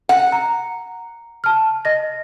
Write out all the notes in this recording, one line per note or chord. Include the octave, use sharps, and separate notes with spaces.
F#5
A#5
A5 F6
D#5 A#6